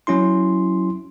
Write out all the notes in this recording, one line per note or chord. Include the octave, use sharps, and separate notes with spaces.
F#3 C#4 E4 C6